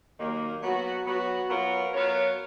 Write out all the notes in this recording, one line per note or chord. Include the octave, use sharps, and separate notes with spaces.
D#2 D#3 F#3 A#3
F#3 B3 F#4
F#3 B3 F#4
F#3 B3 F4 A#4 C#5
F#3 B3 F4 A#4 C#5